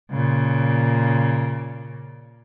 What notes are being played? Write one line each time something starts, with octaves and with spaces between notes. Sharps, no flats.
A#2 C#3